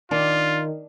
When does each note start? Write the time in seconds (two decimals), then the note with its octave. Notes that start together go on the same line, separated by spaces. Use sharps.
0.11 D#3 D4 F4